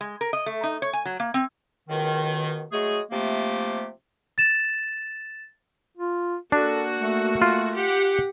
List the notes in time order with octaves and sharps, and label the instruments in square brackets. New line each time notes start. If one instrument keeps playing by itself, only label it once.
[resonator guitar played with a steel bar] G#3
A#4
D#5
A3
D#4
C#5
G#5
F#3
A#3
C4
[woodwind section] C#2 B2 D#3
F#3 G#3 A3 G#4
C3 F3 A3 A#3 G4
[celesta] A6 E7
[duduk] F4
[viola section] A#3 F#4 [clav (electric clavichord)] D4 [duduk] A4
[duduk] A3
[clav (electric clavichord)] F4
[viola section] G4 F#5